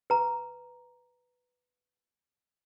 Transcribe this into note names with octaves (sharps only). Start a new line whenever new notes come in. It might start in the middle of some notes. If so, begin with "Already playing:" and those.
B4 A#5